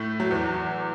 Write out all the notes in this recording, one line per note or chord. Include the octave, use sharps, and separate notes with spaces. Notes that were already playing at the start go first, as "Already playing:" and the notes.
Already playing: A2 A3
F#3
E2 E3